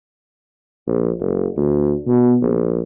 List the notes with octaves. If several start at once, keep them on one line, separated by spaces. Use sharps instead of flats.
A#1
F#1
D2
B2
A#1